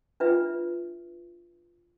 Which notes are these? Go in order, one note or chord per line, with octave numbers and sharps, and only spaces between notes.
D4 F4 B4 E5